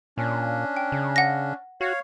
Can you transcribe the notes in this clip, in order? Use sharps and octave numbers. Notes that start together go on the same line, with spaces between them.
A#2 C#4 D4
G5
C#3
F#5 A#6
F#4 C#5 F5